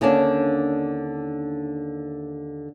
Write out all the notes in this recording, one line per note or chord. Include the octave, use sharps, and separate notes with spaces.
D#2 D3 A#3 C#4 D4 A5